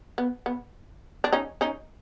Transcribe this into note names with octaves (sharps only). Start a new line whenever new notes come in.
B3
B3
D4
C#4 D#4
C#4 D#4